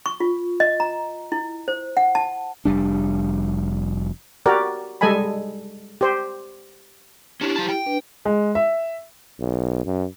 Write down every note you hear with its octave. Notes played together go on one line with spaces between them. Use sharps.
C#6
F4
D#5
A#5
E4
C5
F#5
A5
F1 G3 D4
F#4 G4 A#4 D5
G3 G#3 A4 D#5 G#5 B5
G4 C5
C#4 D4 E4 G4
F#3 A5
G5
D4 B4
G#3
E5
B1
F#2